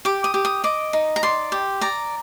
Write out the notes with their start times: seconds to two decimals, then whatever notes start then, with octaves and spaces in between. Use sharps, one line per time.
0.05 G4 D6
0.24 D#6
0.34 G4
0.45 D#6
0.64 D#5 D6
0.93 D#4
1.16 A#5
1.23 D5 C6
1.52 G4
1.81 D5 A#5